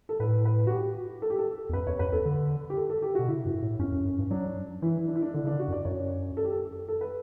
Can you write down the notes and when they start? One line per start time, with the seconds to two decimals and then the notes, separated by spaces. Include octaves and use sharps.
0.09 A4
0.20 A2 B4
0.45 B4
0.67 F#4
0.71 G4
1.22 A4
1.30 G4
1.39 A4
1.69 E2
1.73 F#2 B4
1.87 E2 C#5
1.99 F#2 B4
2.12 E2 A4
2.25 D3
2.70 G4
2.77 A4
2.90 A4
3.02 G4
3.15 B2 F#4
3.28 C#3 E4
3.46 G2
3.62 A2
3.79 F#2 C#4
3.92 F#2
4.05 F#2
4.19 G2
4.30 F#3 D4
4.82 E3 E4
5.08 D4
5.15 E4
5.22 D4
5.34 D3 D4
5.44 C#3
5.47 D3 D4
5.59 F#4
5.68 F#2
5.73 D5
5.85 F#2 C#5
6.37 A4
6.45 G4
6.52 A4
6.88 A4
7.01 B4